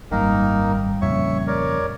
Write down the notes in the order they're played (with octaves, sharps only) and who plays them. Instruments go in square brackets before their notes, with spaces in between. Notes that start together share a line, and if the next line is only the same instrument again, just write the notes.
[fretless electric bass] G#1 F#2 [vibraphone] G3 [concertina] A#3 D#4 A#4
[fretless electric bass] F2 A#2 C#3 [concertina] C#5 E5 C#6
[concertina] A#4 C#5 D5